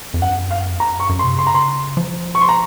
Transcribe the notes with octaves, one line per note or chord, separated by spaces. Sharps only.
F2
F#2 F#5
F5
F2
F#2 A#5
C#6
F#2
C6
C3
C#3 C6
A#5
C6
F3
C#6
C6
A#5